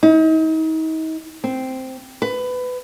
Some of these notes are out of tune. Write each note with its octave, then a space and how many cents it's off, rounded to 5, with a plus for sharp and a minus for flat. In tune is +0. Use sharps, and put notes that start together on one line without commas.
D#4 +40
C4 -5
B4 +20